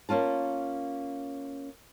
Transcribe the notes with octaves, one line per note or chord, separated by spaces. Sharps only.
A#3 C#4 F4 A5